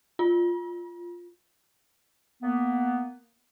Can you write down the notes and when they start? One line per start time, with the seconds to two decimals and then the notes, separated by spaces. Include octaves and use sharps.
0.19 F4
2.43 A#3 B3